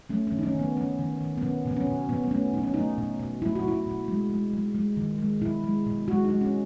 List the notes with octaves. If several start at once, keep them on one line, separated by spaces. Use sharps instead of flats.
A3 C#4
D#3 C#4
D#4
C#4
D#3 B3
D#3 C#4
D#3
D#3
B3
B2 C#4
B2 B3
C#4
B2
B2 B3
B3
A3 C#4
B2 D#4
C#4
A3 D#4
B2
B2
A3 E4
F#4
B2 E4
B2
G#3
G#3
G#3
G#3
D#3
G#3
B2 E4
G#3
B2
G#3 F#4
D#4
G#3
C#4